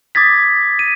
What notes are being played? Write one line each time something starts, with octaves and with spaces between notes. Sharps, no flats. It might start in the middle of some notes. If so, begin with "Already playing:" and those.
D6 D#6 G#6 A6 B6
D#7